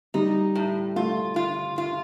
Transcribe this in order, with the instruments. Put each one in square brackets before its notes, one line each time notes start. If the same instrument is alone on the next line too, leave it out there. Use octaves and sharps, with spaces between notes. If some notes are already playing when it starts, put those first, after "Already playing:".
[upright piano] G3 [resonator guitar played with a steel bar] D#4
[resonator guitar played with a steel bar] A2
[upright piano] A3 [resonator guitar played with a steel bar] F4
[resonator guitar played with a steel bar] F4
F4